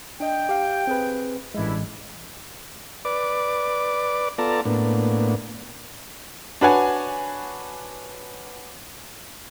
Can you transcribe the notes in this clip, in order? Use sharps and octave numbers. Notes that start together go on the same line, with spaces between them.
D4 D#5 G5
G4 F5
C4 G#4 B4
A1 G2 G#3 D4 E4
B4 D5 D6
B3 F4 A4 D5 A5 A#5
A2 A#3 B3 D4
D4 F#4 B4 C#5 F#5 G#5